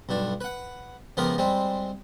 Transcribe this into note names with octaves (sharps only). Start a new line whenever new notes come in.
B1 G2 D4
B4 F#5
C#2 F3 B3 G4 A#4
G3 G#3 C4